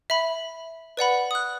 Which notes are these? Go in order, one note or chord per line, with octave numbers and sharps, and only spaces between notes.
E5 B5
B4 D5 F#5 B5
D#6 F#6